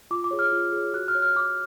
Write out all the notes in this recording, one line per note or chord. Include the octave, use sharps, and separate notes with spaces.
F4 D6
D6
G#4 C#5
F6
F4
G#4 C#5
F#4 F#6
F6
C#5
F6
F#4 D6